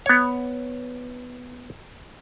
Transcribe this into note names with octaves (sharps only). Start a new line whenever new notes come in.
B3 C#5